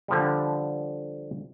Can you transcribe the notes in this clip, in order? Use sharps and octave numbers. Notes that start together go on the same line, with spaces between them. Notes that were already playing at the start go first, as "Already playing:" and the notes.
D3 F3 G3